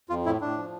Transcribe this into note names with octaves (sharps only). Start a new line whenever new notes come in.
F2 F4
A2 E4
A2 D4
F3